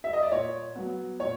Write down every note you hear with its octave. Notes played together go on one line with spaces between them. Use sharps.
E5
D#5
D5
A#2 C#5
F#3 B3
A#2 C#5